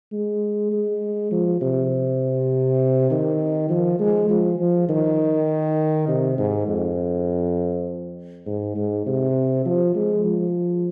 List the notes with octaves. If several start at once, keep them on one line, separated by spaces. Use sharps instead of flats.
G#3
G#3
F3
C3
D#3
F3
G#3
F3
F3
D#3
C3
G#2
F2
G#2
G#2
C3
F3
G#3
F3